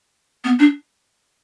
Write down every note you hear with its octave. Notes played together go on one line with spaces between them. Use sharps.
B3
D4